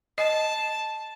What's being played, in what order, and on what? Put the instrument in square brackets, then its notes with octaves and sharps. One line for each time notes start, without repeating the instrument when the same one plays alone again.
[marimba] D#5 [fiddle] A5